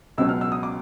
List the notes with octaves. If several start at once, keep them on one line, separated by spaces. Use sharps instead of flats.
C#2 B2 F#3 E6
F6
E6
D#6
D6